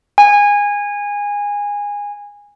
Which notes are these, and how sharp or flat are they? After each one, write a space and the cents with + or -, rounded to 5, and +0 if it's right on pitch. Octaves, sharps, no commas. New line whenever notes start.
G#5 -20